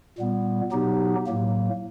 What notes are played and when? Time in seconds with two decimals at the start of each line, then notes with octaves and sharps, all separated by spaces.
0.18 A#2 G3 B3
0.72 B2 F#3 B3 D#4 G4
1.26 A2 F#3 A#3